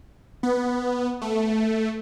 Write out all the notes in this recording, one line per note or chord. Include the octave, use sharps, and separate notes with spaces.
B3
A3